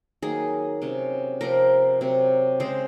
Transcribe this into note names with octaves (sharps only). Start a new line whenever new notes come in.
D#3 F#3 A#3 G#4
C3 F#3 C#4
C3 F3 C4 A#4
C3 F#3 C4
C#3 G#3 C4 C5